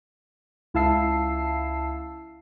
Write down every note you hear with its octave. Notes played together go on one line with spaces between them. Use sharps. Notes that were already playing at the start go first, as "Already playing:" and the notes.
C#2 E4 F5 A5 E6 C7